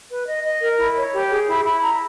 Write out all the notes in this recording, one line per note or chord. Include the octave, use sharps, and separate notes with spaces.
B4
D#5
D#5
A#4
E4
C#5
G4
G#4
E4
E4
A#5